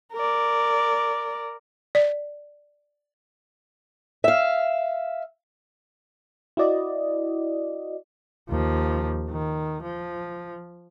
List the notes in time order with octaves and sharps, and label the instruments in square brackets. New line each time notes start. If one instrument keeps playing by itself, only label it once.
[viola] A#4 D5
[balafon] D5
[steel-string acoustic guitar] E5 F5
[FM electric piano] E4 F#4 D5 D#5
[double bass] D#2 F3
D#3
F3